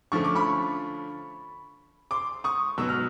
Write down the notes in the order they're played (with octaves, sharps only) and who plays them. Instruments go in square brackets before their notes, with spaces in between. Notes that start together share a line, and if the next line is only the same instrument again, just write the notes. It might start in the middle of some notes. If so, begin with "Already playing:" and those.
[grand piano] D3 F3 A3 C#4 C#6
D6
B5 C#6
C6 D6
C#6 D#6
B2 F#3 B3 E6
F6